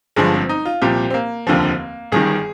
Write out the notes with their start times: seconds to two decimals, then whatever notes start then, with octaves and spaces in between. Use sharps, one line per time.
0.16 G1 G2 D3 F3 G#3
0.33 C4
0.49 D#4
0.65 F4
0.82 C2 A#2 F3 G4
1.10 C4
1.14 A#3
1.47 F1 D#2 D3 F3
2.12 G1 G2 D#3 G#4